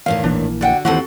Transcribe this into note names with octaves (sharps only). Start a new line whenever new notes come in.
E2 A2 D#3 F5
A#1 E3 A#3 D4
D3 F#4 D5 F#5 G5
D#2 E3 C4 F#4 A4 F#5